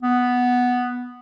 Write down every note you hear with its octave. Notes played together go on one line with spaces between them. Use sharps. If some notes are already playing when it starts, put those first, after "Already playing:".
B3